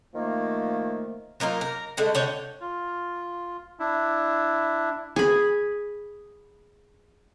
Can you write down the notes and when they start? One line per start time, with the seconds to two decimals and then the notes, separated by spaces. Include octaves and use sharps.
0.14 D#3 F3 A3 A#3
1.40 F#3 A#3 D#4 F4
1.61 A#4
1.97 D3 G#3 A3
2.15 D3 C#5 G5
2.61 F4
3.80 D4 E4
5.16 G#4 B5